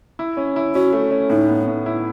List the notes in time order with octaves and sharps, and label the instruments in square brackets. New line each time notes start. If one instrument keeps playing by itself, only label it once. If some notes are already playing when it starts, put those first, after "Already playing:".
[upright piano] E4
C#4
E4
[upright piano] C#4 [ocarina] F#4
[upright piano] A3
C#4
[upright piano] A2 [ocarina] D#4
[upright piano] B3
A2
E4